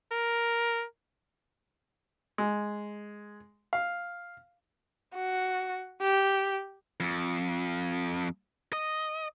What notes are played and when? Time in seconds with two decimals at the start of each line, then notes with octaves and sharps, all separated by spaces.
0.12 A#4
2.38 G#3
3.73 F5
5.14 F#4
6.01 G4
7.00 F2
8.73 D#5